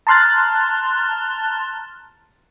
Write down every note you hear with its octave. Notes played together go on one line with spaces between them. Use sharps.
A5 A#5 C6 F6 F#6 A6